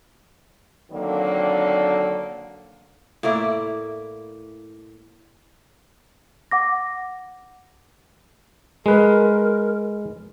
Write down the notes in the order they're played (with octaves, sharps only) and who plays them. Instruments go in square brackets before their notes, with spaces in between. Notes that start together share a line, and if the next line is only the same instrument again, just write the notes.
[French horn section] D3 D#3 F#3 A#3 C4 D4
[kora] A2 A#3 E4 D5
[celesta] F#5 D6 A#6
[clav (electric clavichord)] G#3 B4 [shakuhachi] A#4